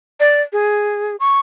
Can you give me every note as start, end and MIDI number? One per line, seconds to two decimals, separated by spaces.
0.20 0.42 74
0.53 1.16 68
1.20 1.40 85